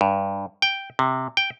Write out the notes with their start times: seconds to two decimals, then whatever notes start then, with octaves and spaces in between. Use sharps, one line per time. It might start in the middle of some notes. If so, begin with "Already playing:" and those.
0.01 G2
0.62 G5
0.99 C3
1.37 G5